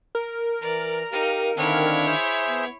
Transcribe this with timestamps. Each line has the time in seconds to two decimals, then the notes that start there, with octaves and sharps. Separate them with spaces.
0.15 A#4
0.62 E3 D5 A#5
1.12 D#4 G4 F5
1.57 D3 D#3 C4 D4 E4 C#5 F5
2.07 G#4 C5 E5
2.48 B3